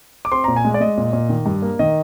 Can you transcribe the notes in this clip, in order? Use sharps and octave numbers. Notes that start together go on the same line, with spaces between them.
D6
C4 C6
A#2 A#5
G#5
G#3
D5
G#3 D#5
A#2
A#2
D#3
G2
A#3
D#3 D#5